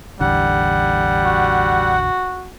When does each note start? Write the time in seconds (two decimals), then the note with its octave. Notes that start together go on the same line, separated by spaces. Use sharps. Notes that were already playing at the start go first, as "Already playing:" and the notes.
0.20 A1 E2 D3 G3 F#5
1.24 F#4